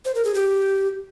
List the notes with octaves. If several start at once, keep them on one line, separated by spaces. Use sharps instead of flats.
C5
A#4
G#4
G4